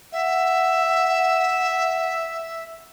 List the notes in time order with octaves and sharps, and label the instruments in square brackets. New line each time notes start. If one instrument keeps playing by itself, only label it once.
[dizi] E5 [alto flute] F#5